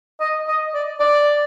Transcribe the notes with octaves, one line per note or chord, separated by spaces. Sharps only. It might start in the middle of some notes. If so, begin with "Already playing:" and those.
D#5
D#5
D5
D5